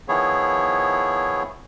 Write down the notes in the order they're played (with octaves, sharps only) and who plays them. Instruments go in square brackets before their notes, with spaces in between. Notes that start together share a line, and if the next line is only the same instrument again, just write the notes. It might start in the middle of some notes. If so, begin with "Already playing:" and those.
[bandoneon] D#3 F3 B3 E4 G#4 C#5